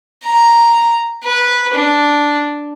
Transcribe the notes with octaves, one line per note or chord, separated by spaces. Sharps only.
A#5
B4
D4